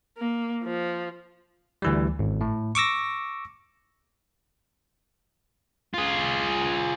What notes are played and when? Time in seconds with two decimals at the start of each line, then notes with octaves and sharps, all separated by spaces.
0.17 A#3
0.63 F3
1.82 D2 E3 G3
2.19 G#1
2.41 A2
2.75 C#6 D6 E6 A#6
5.94 F4 G#4